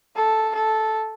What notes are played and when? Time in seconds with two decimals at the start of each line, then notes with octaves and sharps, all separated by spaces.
0.16 A4
0.55 A4